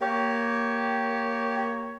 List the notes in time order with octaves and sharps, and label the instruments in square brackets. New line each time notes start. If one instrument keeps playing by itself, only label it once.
[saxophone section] A#3 C#5 [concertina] G4